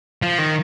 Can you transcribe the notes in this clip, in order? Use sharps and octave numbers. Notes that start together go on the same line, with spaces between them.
F3
D#3